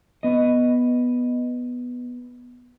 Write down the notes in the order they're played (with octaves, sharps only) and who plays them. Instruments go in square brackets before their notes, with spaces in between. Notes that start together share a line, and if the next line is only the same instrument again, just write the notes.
[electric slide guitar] B3 D#5